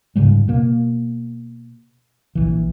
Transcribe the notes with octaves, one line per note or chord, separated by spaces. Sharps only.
G#2 C#3 G3 G#3
B2 A#3
A#1 E3